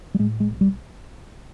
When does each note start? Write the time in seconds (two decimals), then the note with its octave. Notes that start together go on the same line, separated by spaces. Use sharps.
0.14 G3
0.19 A2 G#3
0.40 G#3
0.51 B1
0.61 G3